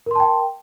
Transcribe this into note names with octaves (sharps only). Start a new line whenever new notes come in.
A#4 G5 A5 C6